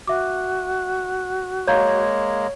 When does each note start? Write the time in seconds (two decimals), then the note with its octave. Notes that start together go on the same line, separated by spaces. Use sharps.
0.07 F#4 E5 D6
1.67 G#3 A#3 C#5 F5 A#5 G6